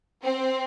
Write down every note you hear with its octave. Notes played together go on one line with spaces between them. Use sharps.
C4